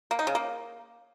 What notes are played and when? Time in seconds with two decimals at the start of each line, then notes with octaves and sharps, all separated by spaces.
0.11 A#3
0.19 D#4
0.27 C#3
0.35 A#3